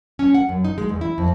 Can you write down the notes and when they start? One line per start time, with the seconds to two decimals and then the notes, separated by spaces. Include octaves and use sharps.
0.19 C#4
0.34 F#5
0.49 F#2
0.64 D#4
0.78 G#3
0.89 E2
1.01 E4
1.18 F2